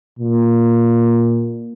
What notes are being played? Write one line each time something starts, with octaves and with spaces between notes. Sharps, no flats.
A#2